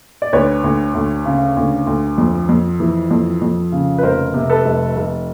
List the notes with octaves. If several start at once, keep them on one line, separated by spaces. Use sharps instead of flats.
D5
D2 B4 C#5
D2
D2
C#3
D2
D2
F2
F2
E3
F2
F2
C#3
B4
F1 A#4 C5
C3
A4 B4
F1
F1